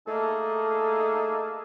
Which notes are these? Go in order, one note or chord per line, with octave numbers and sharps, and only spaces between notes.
A3 A#3 D#4 G#4 A4